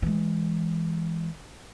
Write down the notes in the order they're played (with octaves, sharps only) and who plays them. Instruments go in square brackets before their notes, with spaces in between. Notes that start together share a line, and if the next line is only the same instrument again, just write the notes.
[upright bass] E3 G#3